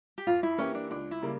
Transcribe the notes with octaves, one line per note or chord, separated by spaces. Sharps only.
G4
F2 F4
E4
E3 A#3 C#4 E4 G4
D4
C#2 D4
E4
C#3 G3 A#3